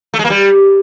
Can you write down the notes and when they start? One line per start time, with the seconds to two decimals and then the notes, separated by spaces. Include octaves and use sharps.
0.14 A3
0.19 G#3
0.25 A#3
0.30 G3